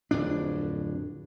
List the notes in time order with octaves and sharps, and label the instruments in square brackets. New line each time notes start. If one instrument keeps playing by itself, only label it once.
[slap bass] D1 F2 A2 D4